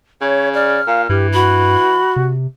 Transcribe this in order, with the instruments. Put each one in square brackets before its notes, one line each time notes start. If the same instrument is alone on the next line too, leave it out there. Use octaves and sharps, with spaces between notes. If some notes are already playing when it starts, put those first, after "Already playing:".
[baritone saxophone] C#3 [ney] C#5
[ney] D5 [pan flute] F6
[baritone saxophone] A#2 [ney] F5
[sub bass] G2 [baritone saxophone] E3 [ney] G4
[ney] F#4 [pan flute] B5
[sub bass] C3